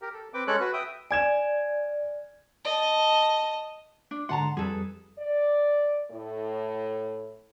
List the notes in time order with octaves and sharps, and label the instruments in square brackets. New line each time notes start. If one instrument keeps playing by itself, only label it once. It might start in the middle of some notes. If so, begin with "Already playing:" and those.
[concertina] G4 A#4
A4
C4 B4 G5 D6
G#3 C#4 A4 C#5 F#6
F#4 B4
E5 G5 D#6
[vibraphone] D5 [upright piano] G#5 G#6 E7
[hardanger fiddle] D#5 A5
[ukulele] D4
[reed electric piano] G#2 D3 C6 [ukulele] F#5 A5 A#5
[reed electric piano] F2 G3 [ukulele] G#4 A4 B4
[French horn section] D5
A2